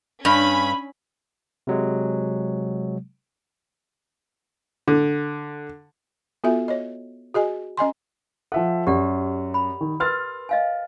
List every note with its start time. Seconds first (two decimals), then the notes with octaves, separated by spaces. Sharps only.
0.25 G2 C#4 B5
1.67 C3 F#3 G#3
4.88 D3
6.44 B3 F4 F#4 A4 E5 G#5
6.68 C#5 D#5
7.34 F#4 G#4 D#5 G#5
7.77 C#4 D#5 G#5 C6
8.52 F3 A4 E5 F#5
8.87 F#2 G4 D5 F#5
9.54 B5
9.81 D#3
10.00 A#4 B4 C6 F6 A6
10.49 D#5 F5 G#5